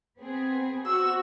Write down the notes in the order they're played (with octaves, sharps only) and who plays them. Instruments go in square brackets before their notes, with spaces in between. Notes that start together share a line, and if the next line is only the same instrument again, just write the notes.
[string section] B3 C4 G#4
[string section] F#4 C5 [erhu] E6